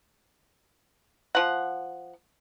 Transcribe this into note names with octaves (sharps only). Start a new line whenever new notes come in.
F3 F#5